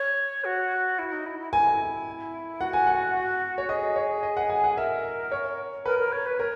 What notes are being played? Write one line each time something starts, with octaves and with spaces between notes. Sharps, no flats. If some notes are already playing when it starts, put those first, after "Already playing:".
Already playing: C#5
F#4
E4
D#4
E4
E4
E4 G#5
F#4 F#5
G#5
F#5
C#5
G#4 D#5
C#5
D#5
F#5
G#5
F#5
A#4 E5
C#5
A#4 B4
A#4
C#5
B4
A#4 C#5